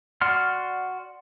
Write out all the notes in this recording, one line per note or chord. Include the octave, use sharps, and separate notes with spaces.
F#4 D5 F#5 C6 F6